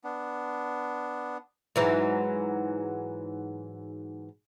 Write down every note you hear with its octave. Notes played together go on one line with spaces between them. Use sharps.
B3 D4
G#2 E3 F#3